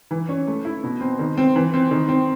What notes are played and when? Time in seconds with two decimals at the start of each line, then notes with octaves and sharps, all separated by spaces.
0.11 E3
0.29 C#4
0.47 A3
0.65 E4
0.83 B2
1.01 C4
1.19 D#3
1.38 C4
1.56 E3
1.74 C4
1.91 D#3
2.09 C4